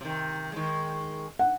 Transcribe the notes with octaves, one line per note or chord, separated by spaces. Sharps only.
C3 D#3
D#3 G#3
F#5